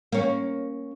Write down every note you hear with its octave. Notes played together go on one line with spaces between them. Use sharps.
A#3 C#4